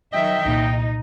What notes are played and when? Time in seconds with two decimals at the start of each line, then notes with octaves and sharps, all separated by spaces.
0.13 D#3 F#3 D#5 E5 G5
0.45 C2 A#2 D#4